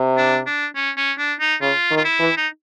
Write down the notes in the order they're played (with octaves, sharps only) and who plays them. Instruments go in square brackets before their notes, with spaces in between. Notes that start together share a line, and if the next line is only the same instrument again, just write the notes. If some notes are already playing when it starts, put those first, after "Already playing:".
Already playing: [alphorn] C3
[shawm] D4
D4
C#4
C#4
D4
D#4
[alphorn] C#3 [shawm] F4
[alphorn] D#3
[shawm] F4
E4
[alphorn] E3
[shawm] D#4